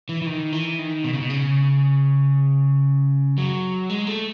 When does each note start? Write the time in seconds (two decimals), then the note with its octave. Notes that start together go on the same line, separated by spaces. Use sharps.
0.09 E3
0.22 E3
0.26 D#3
0.52 E3
0.79 D#3
1.04 B2
1.13 C#3
1.21 B2
1.30 C#3
3.38 F#3
3.90 G#3
4.07 A3